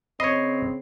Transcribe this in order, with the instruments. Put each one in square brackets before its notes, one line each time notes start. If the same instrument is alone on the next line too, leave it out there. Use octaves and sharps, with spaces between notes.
[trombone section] C#3 C4 [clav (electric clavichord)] C#5 D#5 [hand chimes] B5 C7